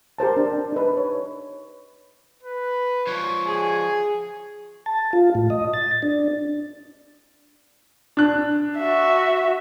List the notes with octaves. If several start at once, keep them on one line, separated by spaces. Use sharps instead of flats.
G4 A#4 C5 A5
D4
D#4 B4
C#5
B4
F3 C#5
G#4 G#5
A5
F4
A2
D#5
A6
D4
D4 F#6
F#4 E5